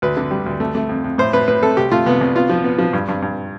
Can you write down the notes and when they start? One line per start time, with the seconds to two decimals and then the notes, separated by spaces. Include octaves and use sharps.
0.02 D2 B4
0.17 D3
0.31 G3
0.46 D2
0.60 A3
0.75 A3
0.89 F2
1.04 F2
1.18 A2 C5
1.33 A2 B4
1.48 A2 B4
1.63 A3 A4
1.77 C2 G4
1.91 A3 F4
2.06 C2 B3
2.21 C2
2.35 B3 F4
2.50 F3
2.64 B3
2.79 F3
2.93 G2
3.08 G2
3.22 G2